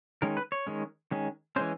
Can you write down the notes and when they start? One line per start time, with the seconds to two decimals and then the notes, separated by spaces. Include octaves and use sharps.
0.22 D#3 G#3 C#4 A#4
0.37 B4
0.52 C#5
0.67 D#3 G#3 C#4
1.11 D#3 G#3 C#4
1.56 E3 G#3 C#4 C5